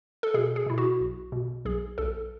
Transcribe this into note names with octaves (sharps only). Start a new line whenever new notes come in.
A4
B2 G#4
G#4
B2 E4
F#4
B1
B2
B1 G#4
B1 A4